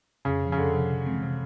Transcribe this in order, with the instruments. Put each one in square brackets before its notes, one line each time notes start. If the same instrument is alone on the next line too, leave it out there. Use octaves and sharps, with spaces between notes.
[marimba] F2 [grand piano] C#3
[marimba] C3 F3
[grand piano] C#3
[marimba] F2 [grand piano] D3
[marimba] C3 F3
C3
E3 G#3 C4
C3